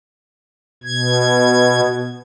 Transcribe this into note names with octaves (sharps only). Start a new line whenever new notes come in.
B2 G#6